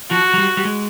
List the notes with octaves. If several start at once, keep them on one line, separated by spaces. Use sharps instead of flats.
F3 F#4
F#3
G3
G3
G#3